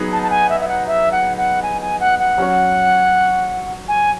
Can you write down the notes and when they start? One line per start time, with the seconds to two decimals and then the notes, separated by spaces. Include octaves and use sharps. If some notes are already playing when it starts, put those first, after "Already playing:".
Already playing: F#3 B3 D#4 G#4
0.13 A5
0.23 A5
0.30 G#5
0.50 E5
0.61 E5
0.68 F#5
0.87 E5
1.12 F#5
1.37 F#5
1.63 G#5
1.81 G#5
2.00 F#5
2.19 F#5
2.38 F#3 C#4 F#4 C#5
3.88 G#5